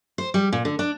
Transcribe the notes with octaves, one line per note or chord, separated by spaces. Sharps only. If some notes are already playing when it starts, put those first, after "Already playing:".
C5
G3
A#2
D3
D4